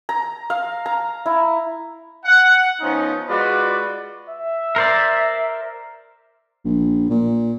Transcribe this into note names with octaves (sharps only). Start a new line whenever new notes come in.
A#5
F5
A#5
E4
F#5
F3 B3 C#4 D#4
G#3 F4 F#4 B4 D5
E5
A#4 C5 D5
A#1
A#2